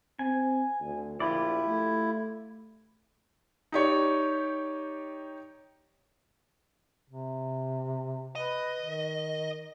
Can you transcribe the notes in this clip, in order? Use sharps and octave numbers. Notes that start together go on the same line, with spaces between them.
C4 G#5
D2
A#1 E4 F4 G4 D5
A3
D#4 G4 C#5 D5
C3
B4 D#5
D#3